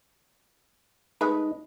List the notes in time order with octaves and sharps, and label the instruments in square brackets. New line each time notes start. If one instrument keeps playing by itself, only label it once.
[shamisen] G#3 A3 B4 [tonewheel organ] D#4